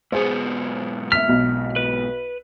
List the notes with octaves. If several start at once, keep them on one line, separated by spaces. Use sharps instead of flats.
G#2 B2 B3 G#4 C5
E5 F6 B6
B1
B4